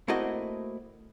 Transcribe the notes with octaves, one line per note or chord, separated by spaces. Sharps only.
A3 A#3 C4 E4 F#4 D#5